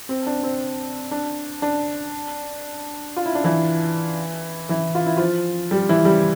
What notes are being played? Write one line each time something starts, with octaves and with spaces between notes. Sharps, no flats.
C4
D4
C4
D4
D4
F4
E4
D4
E3 E4
E3 E4
F4
E4
F3 F4
G3 G4
E3 E4
G3 G4